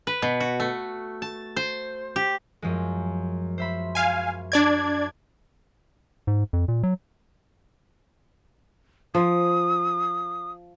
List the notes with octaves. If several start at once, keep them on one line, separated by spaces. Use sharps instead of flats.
B4
B2
F#4
A3
A5
C5
G4
F#2 F3 G#3
C5 E5 B5
F5 G#5
D4 D5 G#6
G#2
F2
A#2
F#3
F3 D#6